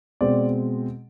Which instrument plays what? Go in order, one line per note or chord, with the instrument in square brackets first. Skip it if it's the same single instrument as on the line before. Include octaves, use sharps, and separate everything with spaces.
[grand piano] B2 G#3 C4 D5